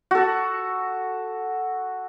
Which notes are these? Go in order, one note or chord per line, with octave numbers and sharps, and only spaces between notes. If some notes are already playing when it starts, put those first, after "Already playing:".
F#4 A4